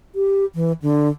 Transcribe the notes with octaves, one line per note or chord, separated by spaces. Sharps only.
G4
E3
D3